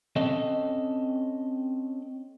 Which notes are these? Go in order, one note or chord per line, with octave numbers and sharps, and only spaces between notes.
C4 C#4 A4 D#5